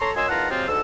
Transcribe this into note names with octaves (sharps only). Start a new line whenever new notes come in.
A4 C#5 A#5 C6
F#2 F#3 D#5 G#5 C6 E6
E2 D#3 F4 F#5 A5 A#5
C3 F#3 G#3 C4 F4
D2 G#2 A4 E6